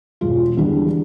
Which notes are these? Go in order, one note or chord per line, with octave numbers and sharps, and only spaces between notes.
E1 F4
E2 D3 G3 D4